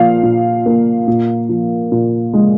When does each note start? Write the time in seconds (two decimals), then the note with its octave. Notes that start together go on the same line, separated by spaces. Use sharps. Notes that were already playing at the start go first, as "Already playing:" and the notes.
Already playing: A#2 F3 F5
0.23 A#2
0.66 A#3
1.07 A#2
1.49 F3
1.92 A#2
2.33 G#3